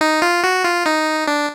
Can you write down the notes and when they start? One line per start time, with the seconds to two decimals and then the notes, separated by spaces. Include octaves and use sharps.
0.01 D#4
0.22 F4
0.44 F#4
0.64 F4
0.86 D#4
1.27 D4